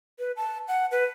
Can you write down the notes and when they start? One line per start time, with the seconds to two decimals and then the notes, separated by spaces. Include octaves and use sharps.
0.19 B4
0.37 A5
0.68 F#5
0.91 B4